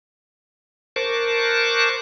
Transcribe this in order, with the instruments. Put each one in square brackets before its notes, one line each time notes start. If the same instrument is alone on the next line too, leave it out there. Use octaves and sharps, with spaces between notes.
[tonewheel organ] A#4 C5 A5 C#6 D6 F#6